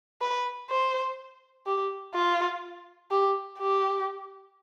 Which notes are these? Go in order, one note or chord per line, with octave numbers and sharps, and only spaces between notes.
B4
C5
G4
F4
G4
G4